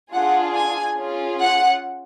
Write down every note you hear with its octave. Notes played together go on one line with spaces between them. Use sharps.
D4 F4 G#4 F#5
G#5
C#4 F4 G#4
F#5